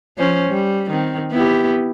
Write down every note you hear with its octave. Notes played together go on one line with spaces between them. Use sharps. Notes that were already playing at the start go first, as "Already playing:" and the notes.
F3 C#4 C5
G3
D#3 C4
B3 E4 G4